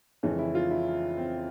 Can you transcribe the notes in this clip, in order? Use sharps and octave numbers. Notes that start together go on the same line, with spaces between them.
F2 C#3 E3 G#3 C#4
E4
F4
E4
C4